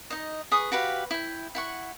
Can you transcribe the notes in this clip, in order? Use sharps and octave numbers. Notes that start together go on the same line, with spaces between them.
D#4 D#5
G#4 B4 C#6 D#6
F#4 G4 B4 F5
E4 G5
E4 F#5 C#6